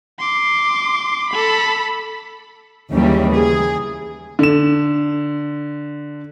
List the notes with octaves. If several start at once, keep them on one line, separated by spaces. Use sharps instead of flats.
C6 D6
A4 B5
D#2 C#3 E3 G3
G#4
D3 E7